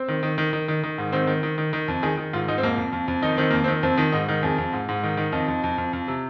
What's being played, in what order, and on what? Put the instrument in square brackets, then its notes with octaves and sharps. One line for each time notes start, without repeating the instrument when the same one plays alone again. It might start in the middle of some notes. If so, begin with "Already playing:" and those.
Already playing: [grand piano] C4
D#3
D#3
D#3
D#3
D#3
D#3
G#2
D#3 C4
D#3
D#3
D#3
D#3
F2
D#3 G#4
D#3
G#2 F4
G#2 D#4
C4
F2 A#3
F2
F2
F2
D#3 D#4
D#3 C4
F2 A#3
C4
D#3
F2 C4
D#3
G#2 D#4
D#3
F2 G#4
F2
G#2
G#2
D#3
D#3
F2 D#4
F2
F2
F2
F2
C3